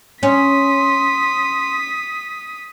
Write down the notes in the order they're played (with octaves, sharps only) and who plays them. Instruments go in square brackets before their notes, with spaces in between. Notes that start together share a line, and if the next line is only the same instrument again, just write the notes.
[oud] C#4 [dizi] C6 [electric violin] D#6 B6